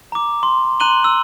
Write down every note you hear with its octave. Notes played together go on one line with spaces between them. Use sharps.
A#5 D6
C6
A#5 C6 F#6 D#7 F#7 G7
E6